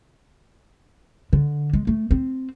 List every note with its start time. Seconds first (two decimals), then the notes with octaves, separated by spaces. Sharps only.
1.33 D3
1.73 G#3
1.87 A3
2.11 C4